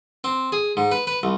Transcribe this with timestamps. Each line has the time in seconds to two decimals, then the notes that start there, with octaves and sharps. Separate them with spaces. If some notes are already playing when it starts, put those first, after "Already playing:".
0.24 C4
0.52 G#4
0.77 G#2
0.92 B4
1.07 B4
1.23 C2